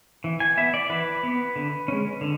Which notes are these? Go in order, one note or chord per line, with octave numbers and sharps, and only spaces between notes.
E3
G#5
B3 E5
D5
E3 B4
B3
D3
G#3 C#4
D3